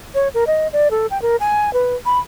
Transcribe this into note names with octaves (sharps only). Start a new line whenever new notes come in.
C#5
A#4
D#5
D5
A4
G5
A#4
G#5
B4
B5